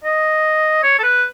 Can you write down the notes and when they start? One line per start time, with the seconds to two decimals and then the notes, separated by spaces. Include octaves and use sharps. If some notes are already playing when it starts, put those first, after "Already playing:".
0.04 D#5
0.83 C#5
0.99 A4
1.03 B4